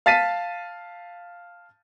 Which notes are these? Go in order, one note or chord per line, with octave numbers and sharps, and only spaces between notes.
F5 A5 A6 B6 C7 D#7